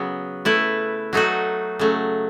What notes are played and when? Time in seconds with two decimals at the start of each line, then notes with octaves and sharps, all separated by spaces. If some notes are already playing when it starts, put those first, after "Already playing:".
Already playing: C#3 F#3 B3
0.45 A3 E4 B4
1.13 F#3 A3 D#4 F#4
1.79 C#3 F#3 A3